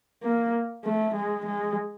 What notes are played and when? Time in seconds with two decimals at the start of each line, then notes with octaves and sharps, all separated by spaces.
0.23 A#3
0.85 A3
1.15 G#3
1.46 G#3